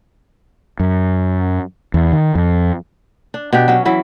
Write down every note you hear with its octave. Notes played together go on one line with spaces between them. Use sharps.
F#2
E2
D#3
F2
D4
B2 D4 G4
F#3 C#4
E3 F#3 E4